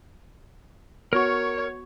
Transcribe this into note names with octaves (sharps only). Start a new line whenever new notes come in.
B3 F#4 A#4 C#5 C#6